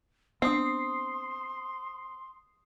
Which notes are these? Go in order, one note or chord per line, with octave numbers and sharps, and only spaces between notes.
B3 C4 D4 C6 D#6 C7